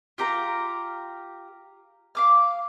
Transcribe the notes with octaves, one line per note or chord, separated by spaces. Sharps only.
F4 G4 A#4 A#5
F5 D6 F6